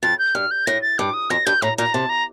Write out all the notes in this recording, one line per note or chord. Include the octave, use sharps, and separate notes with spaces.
F2 A6
G6
G2 F6
G6
A2 A#6
A6
G2 D6
D#6
F2 A#6
G2 G6
A2 A#5
A#2 A#5
C3 A5
A#5